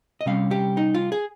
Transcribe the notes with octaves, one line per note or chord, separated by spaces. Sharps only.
D#5
C3 G3 C#4 F5
G4
D#4
F4
G#4